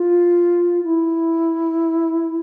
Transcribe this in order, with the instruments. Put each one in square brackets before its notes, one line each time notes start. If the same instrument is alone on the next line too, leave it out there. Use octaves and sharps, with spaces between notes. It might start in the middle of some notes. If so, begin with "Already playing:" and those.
Already playing: [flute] F4
E4